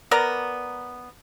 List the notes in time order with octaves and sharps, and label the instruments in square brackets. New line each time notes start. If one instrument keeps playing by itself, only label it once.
[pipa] B3 A#4 D5 A#5